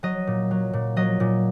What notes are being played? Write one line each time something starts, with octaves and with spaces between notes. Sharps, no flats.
F#3 D#5
A#2
F#3
A#2
F#3 D#5
A#2